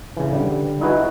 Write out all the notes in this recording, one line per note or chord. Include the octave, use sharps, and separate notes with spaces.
C#3 E3
D3 G3
D#4 E4 F#4 G#4 B4 D#5